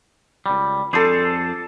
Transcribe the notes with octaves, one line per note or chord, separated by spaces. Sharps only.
C#2 G3
F2 G#4 A4 C5 D5